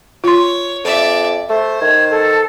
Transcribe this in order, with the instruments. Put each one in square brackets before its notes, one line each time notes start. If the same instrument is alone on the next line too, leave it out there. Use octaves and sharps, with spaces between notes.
[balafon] F4 C6 [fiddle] C#5
[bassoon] F2 [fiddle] D5 E5
[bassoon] A3 [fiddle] C5
[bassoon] D#3 [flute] G#6
[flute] A4